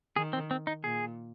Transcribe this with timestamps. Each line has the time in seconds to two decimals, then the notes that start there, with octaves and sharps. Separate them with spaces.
0.16 D#3 G#4
0.33 C4
0.51 C4
0.67 D#4
0.84 A#2 G#4